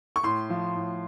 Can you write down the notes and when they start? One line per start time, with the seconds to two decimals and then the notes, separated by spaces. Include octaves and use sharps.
0.16 C#6
0.23 A2 C6
0.50 F3
0.75 A2